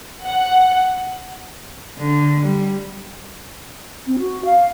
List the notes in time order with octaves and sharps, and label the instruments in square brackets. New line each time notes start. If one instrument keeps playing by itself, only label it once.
[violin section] F#5
[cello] D3
G3
[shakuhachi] C4
F#4
F5